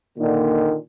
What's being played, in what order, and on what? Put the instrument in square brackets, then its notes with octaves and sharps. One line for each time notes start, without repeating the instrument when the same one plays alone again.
[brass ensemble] A#2 D3 D#3